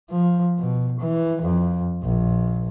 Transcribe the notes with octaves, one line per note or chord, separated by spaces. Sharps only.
F3
B2
E3
F2
A#1